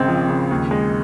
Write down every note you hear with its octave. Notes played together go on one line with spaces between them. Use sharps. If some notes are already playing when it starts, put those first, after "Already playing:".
Already playing: G#1 C#3 C4
F3
C#3
D#2
G#3